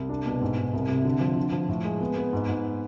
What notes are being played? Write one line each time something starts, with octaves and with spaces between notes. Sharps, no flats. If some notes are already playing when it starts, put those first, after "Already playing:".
Already playing: C2
D4
B2
G#2
G#2
C2
C3
D3
F3
D3
F3
A2
G#3
B3
B3
G#2
G#2